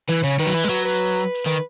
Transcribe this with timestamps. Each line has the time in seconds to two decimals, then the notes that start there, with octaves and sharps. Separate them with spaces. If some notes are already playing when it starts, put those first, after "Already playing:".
0.08 E3 B4
0.24 C#3 C#5
0.39 D#3 B4
0.46 F#3
0.54 E3
0.64 G#3
0.69 F#3
0.85 B4
1.46 D#3 B4